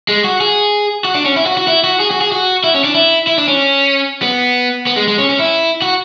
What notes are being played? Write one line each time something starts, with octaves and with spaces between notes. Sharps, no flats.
G#3
F#4
G#4
F#4
D4
C#4
E4
F#4
F#4
E4
F#4
G#4
F#4
G#4
F#4
E4
C#4
D4
E4
E4
D4
C#4
B3
B3
G#3
G#3
C#4
C#4
E4
F#4